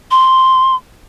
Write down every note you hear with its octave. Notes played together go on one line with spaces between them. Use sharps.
C6